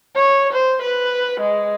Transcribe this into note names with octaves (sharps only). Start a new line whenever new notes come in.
C#5
C5
B4
G#3